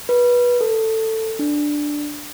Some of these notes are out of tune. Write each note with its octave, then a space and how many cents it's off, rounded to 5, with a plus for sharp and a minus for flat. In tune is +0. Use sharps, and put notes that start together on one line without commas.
B4 -20
A4 +15
D4 +5